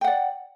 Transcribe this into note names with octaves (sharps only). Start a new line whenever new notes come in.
D5 F#5 G5